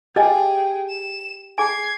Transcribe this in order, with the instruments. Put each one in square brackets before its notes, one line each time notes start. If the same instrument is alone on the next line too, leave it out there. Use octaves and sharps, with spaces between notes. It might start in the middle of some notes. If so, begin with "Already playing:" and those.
[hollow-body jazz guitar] G4 F5 G#5 [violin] G#4 G5 [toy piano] D#5
[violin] E7
[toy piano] G#4 G#5 [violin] G#6 C7